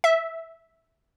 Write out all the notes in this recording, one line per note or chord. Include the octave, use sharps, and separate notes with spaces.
E5